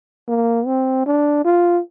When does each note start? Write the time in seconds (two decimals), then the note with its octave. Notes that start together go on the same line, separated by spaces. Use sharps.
0.28 A#3
0.67 C4
1.06 D4
1.45 F4